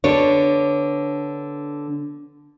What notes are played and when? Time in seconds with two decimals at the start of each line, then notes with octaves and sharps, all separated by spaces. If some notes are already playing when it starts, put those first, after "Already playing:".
0.04 D3 B3 D4 C#5